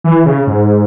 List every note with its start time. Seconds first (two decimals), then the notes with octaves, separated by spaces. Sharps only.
0.04 E3
0.26 C#3
0.47 G#2